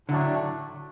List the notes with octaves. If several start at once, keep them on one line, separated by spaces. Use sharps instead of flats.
A2 D3 F#3 A3 D4